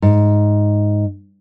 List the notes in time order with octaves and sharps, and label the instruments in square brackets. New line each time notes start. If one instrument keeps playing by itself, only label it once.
[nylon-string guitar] G#2